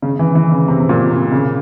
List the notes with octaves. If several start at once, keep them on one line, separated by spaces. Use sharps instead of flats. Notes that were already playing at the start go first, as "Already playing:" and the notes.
C#3
E3
E3
C#3
C3
C3
A#2
C3
C#3